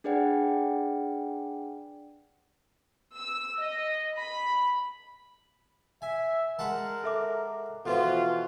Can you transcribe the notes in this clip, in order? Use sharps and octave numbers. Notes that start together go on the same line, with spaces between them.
D4 G#4 B4 D5 F#5 G5
E6
D#5
B5
E5 G#5
G#3 A#4 F#5 A5
A4 E5 D6
B2 E3 F3 F4 A4 B4